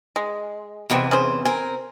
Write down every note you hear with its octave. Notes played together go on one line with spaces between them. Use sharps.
G#3
E2 C3 E3 G#3 B3 C4
C#4 G#4 C5
C4 A#4 G#5